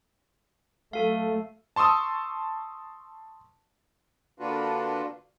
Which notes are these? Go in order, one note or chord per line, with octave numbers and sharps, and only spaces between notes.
F#3 A3 A4 F5
A5 C6 C#6 D#6 E6
D3 A#3 D4 F4 F#4 B4